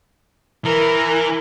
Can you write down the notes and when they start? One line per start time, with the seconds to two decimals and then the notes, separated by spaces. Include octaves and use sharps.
0.65 E3 A#4